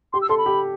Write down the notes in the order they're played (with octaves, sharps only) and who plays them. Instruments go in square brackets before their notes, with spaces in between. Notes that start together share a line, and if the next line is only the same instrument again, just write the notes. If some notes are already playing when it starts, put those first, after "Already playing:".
[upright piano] G4 [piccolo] C6
[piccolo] E6
[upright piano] A4 [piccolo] C6
[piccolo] B5
[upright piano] G4